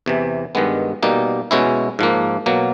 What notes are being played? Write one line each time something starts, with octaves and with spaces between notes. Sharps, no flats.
E2 C3 E3
G2 D#3 G#3 B3
B2 G3 A#3 D#4
B2 G#3 C#4 E4
G#2 F3 A#3
B2 F#3 A#3